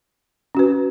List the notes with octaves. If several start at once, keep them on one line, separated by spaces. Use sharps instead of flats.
C#4 F#4 B4